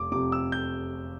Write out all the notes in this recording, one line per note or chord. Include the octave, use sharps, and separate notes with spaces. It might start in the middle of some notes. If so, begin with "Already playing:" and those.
Already playing: F1 D6
F2 C3 D6
E6
G6